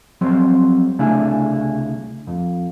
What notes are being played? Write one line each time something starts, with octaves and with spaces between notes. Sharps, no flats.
F2 F#3 G3 C4 C6
C2 C#3 A3 D4 E4 G#4
F2